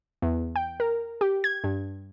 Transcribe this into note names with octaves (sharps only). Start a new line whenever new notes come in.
E2
G5
A#4
G4
G#6
G2